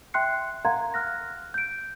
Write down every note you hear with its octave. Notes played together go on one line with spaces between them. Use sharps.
E5 G5 C6 F#6 C7 C#7
A#4 F5 F#5 A#5 C6 G#6
F6 F#6 A#6
G6 D7